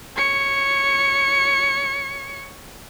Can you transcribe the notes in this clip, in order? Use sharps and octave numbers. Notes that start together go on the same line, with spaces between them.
C#5 C#7